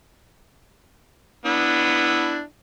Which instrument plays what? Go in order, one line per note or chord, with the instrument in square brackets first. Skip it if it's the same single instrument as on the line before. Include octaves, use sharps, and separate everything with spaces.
[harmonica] B3 D4 E4